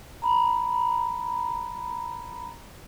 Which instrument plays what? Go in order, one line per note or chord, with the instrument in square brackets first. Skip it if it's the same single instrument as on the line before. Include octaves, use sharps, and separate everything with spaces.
[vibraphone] A#5 B5